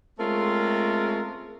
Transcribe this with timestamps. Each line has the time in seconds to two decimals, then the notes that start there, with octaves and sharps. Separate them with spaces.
0.19 G#3 A3 C4 C#4 F4 A#4